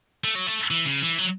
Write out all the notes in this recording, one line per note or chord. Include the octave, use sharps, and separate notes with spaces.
A3
F#3
A3
E3
C#3
E3
F#3